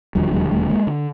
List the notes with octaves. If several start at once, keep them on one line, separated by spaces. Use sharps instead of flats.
E1 D#2 D3 F3 G3
F#3 G#3
G3 A3
G#3 A#3
D3